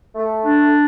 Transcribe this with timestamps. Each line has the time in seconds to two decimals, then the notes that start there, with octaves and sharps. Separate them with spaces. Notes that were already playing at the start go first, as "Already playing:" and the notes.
0.15 A3
0.44 D4